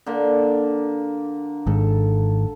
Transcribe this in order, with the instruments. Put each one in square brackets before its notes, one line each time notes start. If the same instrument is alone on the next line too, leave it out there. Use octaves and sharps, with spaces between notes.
[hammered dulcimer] D3 A#3
[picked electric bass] G#1 G#2 [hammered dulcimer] A4